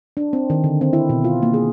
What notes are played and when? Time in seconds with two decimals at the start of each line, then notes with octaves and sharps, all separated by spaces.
0.17 D4
0.33 C4
0.50 D#3
0.64 D3
0.81 C4
0.93 E4
1.09 B2
1.24 F4
1.43 A#3
1.54 G#4